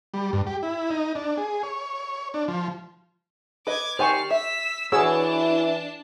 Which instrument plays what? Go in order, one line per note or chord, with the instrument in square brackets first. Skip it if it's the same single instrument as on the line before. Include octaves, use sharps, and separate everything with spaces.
[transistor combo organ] G3
G2
G4
E4
D#4
D4
G#4
C#5
D4
F3
[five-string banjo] B4 D#5 [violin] D6 G#6
[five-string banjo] D#3 G4 G#5 [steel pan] C5 C#6 [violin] D5 F6
[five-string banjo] E5 [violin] E6 B6
[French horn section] E3 [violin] D4 A5 [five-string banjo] F#4 [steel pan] G#4 C#5 E6